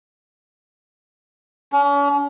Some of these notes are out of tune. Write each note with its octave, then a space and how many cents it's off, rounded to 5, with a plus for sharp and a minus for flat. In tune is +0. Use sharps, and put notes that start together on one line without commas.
C#4 +40